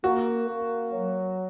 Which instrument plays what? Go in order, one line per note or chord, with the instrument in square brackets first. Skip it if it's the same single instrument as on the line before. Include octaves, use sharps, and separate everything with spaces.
[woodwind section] A#3 [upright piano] F#4
[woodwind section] A#3
F#3